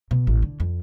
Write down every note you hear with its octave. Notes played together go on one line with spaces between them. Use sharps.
B2
A1
D3
F2